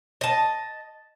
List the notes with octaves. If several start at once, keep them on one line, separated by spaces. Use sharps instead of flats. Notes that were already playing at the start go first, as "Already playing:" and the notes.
D#5 A5